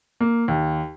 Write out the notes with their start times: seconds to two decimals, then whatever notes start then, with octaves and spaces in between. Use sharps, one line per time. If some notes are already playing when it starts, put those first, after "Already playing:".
0.20 A#3
0.48 D#2